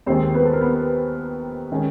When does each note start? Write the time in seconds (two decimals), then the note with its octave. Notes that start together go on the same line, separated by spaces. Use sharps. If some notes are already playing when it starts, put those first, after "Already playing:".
0.06 D#2 D#3 G#3 C4 C5
0.34 B3 B4
0.45 A4
0.53 A#4
0.61 B3 B4
1.72 D#3 G#3 C#4